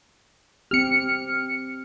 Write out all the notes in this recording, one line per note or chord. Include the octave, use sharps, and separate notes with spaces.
C4 G4 F6 C#7